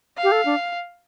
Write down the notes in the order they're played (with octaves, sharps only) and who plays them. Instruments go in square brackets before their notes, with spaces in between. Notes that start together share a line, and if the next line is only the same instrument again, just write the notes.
[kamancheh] F5
[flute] G4
A4
D4